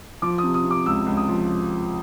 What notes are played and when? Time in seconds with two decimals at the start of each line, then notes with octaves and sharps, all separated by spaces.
0.22 F3 D6
0.38 D#6
0.43 C3
0.54 D#6
0.64 C3
0.71 D6
0.86 C#2 E6
1.06 C#2
1.17 D#6
1.28 F3